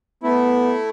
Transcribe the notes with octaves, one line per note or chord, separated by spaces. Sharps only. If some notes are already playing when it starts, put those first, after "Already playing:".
A3 B3 E4